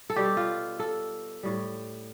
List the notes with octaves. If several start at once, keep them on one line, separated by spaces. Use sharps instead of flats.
A4
B2 G3 G4
F4
A4
A2 G3